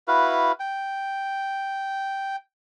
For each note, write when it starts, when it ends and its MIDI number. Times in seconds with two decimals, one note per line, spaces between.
0.08 0.52 64
0.08 0.52 66
0.08 0.52 71
0.08 0.52 77
0.60 2.36 79